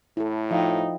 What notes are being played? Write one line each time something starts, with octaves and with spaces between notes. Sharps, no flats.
A2 E4 A4
F3 D#4 E5 F5 G5